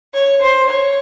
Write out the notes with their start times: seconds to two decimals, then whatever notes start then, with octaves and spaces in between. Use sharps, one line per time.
0.13 C#5
0.41 C5
0.69 C#5